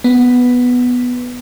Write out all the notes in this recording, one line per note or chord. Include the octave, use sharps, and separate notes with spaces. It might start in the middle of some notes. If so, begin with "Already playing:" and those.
B3